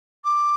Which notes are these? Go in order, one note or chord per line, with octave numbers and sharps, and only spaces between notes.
D6